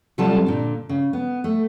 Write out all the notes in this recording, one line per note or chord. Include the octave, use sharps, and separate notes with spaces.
C3 F#3 G3 F4 A4 A5
A#2 D3
C#3
B3
A3